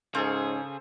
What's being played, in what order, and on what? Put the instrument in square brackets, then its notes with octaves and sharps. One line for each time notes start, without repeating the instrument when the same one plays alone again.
[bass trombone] G#2 [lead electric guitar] C#3 G#4 [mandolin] C#4 [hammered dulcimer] A4 C5